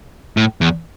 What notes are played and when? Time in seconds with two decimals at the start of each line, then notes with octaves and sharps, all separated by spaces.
0.37 A2
0.61 E2